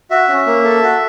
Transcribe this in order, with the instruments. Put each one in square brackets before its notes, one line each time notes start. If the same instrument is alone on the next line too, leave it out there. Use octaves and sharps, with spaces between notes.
[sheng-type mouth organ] F#4 E5
C#4
A#3
A4
F#4